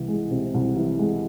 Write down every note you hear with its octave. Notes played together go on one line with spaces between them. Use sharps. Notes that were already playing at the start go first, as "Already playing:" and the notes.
Already playing: C2 E3
G#3
C3
C2
E3
G#3